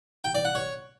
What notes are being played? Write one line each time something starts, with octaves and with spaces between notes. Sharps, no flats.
G5
D5
F#5
C#5